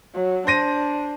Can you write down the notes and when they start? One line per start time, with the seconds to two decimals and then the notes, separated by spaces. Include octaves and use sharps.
0.15 F#3
0.47 D4 C5 A#6 D#7